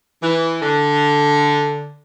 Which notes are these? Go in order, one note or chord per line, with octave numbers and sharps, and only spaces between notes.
E3
D3